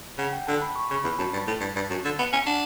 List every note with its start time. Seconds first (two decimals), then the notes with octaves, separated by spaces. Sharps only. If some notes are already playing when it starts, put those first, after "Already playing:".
0.18 C#3 F#5
0.33 G5
0.47 D3 A5
0.62 B5
0.76 C#6
0.90 C#3 C#6
1.04 E2 B5
1.18 F#2 A5
1.33 G2
1.47 A2
1.61 G2
1.75 G2
1.90 F#2
2.04 D3
2.19 B3
2.33 C#4
2.46 D4 F#5